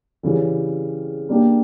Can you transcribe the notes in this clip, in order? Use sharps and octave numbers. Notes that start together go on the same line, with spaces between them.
C#3 E3 G3
G3 A#3 D4 G4